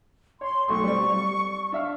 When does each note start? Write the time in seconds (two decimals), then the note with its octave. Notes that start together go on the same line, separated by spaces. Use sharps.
0.41 C#5 C6
0.68 B1 A3 C6 C#6
0.84 G3 C4 D5
1.13 G3
1.72 D4 E5 F5